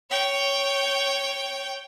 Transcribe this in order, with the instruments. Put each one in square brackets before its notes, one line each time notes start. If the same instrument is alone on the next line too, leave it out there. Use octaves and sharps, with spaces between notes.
[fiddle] C#5 G5